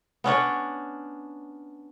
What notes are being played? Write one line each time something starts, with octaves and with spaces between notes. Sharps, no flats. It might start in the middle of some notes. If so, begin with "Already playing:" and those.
B3 C#4 D4 C#5